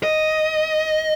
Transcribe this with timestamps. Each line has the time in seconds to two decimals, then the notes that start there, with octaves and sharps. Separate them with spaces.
0.03 D#5